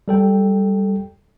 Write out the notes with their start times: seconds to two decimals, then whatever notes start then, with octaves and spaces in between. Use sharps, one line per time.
0.08 G3 A4 G5